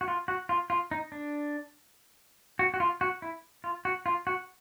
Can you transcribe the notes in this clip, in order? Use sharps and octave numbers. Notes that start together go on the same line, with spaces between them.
F#4
F4
F#4
F4
F4
D#4
D4
F#4
F#4
F4
F#4
E4
F4
F#4
F4
F#4